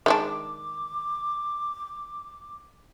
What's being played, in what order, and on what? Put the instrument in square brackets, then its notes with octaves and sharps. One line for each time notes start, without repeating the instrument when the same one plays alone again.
[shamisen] D#3 G#3 D4 [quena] D6